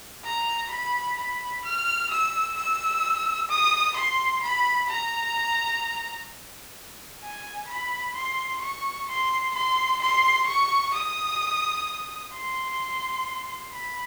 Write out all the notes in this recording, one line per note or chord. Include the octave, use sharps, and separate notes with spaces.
A#5
B5
B5
F6
E6
E6
D#6
C6
B5
A#5
G#5
B5
C6
C#6
C6
C6
C6
C#6
D#6
C6
B5